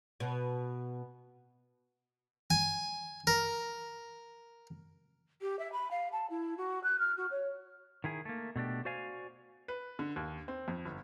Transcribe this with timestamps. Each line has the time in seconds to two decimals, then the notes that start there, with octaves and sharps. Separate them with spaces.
0.20 B2
2.50 G#5
3.27 A#4
5.41 G4
5.59 E5
5.72 B5
5.91 F5
6.12 A5
6.30 E4
6.57 F#4
6.83 F#6
6.99 F6
7.17 F#4
7.31 C#5
8.04 D#3 E4 G#4
8.25 A3 A#3
8.56 B2 A3 D4 G4
8.85 F#4 C5 D5 F5 G#5
9.68 B4
9.99 D3
10.16 D#2
10.48 C4
10.68 F2
10.85 G1